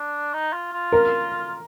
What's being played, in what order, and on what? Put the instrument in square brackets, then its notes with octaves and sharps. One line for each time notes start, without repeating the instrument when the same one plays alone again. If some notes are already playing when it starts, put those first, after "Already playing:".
Already playing: [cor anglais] D4
D#4
F4
F4
[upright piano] A#4